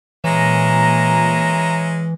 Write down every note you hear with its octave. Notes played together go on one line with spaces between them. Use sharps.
A#2 E3 G#3 C#4 E5 A#5